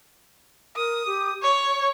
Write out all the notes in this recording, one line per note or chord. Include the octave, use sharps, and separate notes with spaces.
A#4 D#6
G4
C#5 C#6